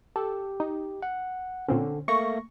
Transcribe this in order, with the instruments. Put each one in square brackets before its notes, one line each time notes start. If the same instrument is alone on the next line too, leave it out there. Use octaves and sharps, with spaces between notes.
[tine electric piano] G4 [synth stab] A4
[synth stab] D#4
[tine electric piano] F#5
[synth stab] A#2 C4 C#4 [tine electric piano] D3
[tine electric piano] A3 A#3 A#6 [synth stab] C#6